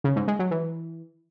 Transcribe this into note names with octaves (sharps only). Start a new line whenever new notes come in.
C#3
G#2
G#3
F#3
E3